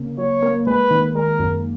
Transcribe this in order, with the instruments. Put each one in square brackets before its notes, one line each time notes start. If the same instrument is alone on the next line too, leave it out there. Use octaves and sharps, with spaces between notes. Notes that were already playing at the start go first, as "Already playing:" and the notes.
Already playing: [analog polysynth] C#3 A#3
[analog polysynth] F#3 [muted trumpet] C#5
[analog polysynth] A#3
[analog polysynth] G#3 [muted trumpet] B4
[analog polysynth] D#3
[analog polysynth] G#3 [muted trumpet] A#4
[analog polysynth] F#2